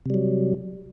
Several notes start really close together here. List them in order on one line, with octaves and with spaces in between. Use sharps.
C3 G3 F#3